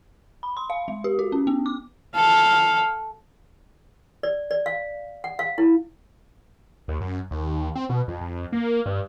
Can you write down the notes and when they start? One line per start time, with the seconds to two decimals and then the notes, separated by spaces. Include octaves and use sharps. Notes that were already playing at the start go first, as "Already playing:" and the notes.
0.43 B5
0.57 C6
0.70 F5
0.88 G#3
1.04 G4
1.19 F#4
1.32 C#4
1.47 B3
1.66 D6
2.15 A4 F5
4.23 D5
4.51 D5
4.66 F5
5.24 F#5
5.39 F5
5.58 E4
6.88 D#2
7.01 F#2
7.31 D#2
7.75 C4
7.89 B2
8.08 F2
8.21 F2
8.52 A#3
8.86 G2